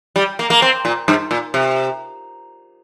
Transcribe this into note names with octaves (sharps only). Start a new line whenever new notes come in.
G3
A#3
A#3
C4
A#2
G2
A#2
C3